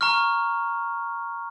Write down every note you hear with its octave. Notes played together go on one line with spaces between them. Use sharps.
A#5 C#6 F6